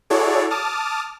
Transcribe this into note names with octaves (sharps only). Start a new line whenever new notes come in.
E4 F#4 G#4 A4 C#5 D5
A5 D6 D#6 F6